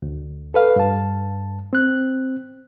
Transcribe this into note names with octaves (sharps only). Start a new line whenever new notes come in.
D2
A4 B4 F5
G2 A5
C4 F#6